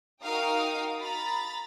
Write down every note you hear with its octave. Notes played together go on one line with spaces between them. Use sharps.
D#4 F#4 A#4 F5 G5 D#6
A#5 B5 A6